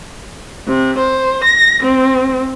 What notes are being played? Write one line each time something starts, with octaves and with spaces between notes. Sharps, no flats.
C3
C5
A#6
C4